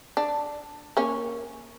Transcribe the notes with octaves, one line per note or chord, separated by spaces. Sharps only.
D4
A#3 C#4